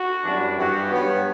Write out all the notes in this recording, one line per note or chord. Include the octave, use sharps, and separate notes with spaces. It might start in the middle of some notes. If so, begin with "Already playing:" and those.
Already playing: F#4
F#2 E3 G3 B3 D4
G2 E3 B3 F#4 G4
G2 F#3 B3